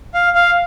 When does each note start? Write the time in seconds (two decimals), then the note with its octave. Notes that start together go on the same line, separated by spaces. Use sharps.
0.14 F5
0.35 F5